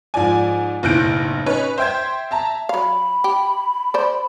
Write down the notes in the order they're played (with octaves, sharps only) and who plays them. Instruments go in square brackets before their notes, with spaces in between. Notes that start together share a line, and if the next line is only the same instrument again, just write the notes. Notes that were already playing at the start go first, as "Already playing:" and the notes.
[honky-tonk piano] G#2 F3 D5 G#5
F#1 B1 A2 F#6 G6 D7
C#4 D#4 B4 C#5
C5 E5 G5 G6 G#6
E5 A5 A#5
[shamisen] F#3 F5 [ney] B5
[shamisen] G4
C5 D5